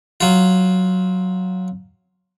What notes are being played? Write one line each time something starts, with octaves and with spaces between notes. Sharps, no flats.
F#3 F4